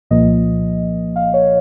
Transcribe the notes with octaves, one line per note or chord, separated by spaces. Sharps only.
C2 A#2 F3 A#3 D#5
F5
C#5